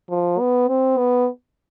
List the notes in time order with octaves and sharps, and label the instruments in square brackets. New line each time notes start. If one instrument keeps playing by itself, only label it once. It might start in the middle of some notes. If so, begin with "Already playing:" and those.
[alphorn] F3
B3
C4
B3